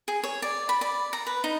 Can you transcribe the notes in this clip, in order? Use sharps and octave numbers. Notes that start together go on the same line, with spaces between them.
G#4
C#5
D5
B5
D5
A#5
B4
D#4